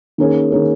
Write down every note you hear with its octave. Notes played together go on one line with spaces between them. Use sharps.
D#3 A#3 C#4 G#4
D#3 A#3 C#4 G#4